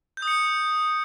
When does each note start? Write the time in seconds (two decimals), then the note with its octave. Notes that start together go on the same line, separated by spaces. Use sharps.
0.17 G6
0.22 D#6
0.28 C#7